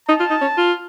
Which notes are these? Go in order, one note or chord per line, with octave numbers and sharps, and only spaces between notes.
D#4 A5
F4
D#4
C#4
F4